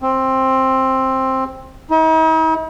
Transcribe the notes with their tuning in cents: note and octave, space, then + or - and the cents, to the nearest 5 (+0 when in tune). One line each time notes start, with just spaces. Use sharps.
C4 +10
D#4 +45